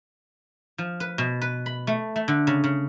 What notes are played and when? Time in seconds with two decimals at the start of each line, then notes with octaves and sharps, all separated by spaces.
0.78 F3
1.00 B4
1.18 B2
1.42 B4
1.66 B5
1.87 A3
2.16 A3
2.28 D3
2.47 C#3
2.64 C#3